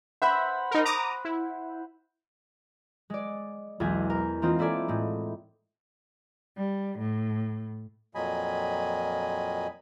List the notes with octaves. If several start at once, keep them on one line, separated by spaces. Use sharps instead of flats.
C5 E5 F#5 B5
D#4 A#4
A#5 D6 D#6
E4
G#3 D5
B1 E2 G#3 G#4 G#5
A#4
E3 A#3 C4 D#4 F4
A#3 E4 A4 D5 G#5
A2 G#3
G3
A2
F2 A#2 F#3 D#5 G#5 B5